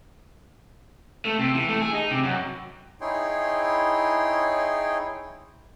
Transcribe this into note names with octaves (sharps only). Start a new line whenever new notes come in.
A3
C3
E3
A3
G#4
D#4
C3
F#2
D#4 E4 G#4 C#5 G5 C6